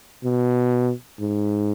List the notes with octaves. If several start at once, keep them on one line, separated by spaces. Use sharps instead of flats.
B2
G#2